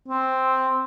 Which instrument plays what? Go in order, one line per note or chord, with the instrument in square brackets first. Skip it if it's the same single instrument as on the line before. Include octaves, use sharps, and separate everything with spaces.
[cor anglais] C4